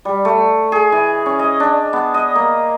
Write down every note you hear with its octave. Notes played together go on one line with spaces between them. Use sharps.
G3
A3
G#4
E3
C#4
D#5
D4
B3
D#5
A#3